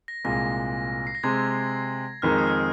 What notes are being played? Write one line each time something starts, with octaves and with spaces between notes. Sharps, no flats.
A#6
C2 A#2 G#3 A#6
C7
A#6
C3 G#3 C4 G#6
F2 D#3 G#3 D#4 A#4 F6
D#6
F6